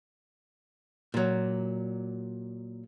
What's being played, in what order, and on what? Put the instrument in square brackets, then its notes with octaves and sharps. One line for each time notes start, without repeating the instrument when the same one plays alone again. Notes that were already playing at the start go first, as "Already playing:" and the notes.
[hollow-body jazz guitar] A#2 F#3